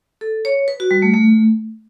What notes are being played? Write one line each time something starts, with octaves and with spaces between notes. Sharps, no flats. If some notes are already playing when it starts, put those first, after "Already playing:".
A4
C#5
B4
F#4
G3
A3
A3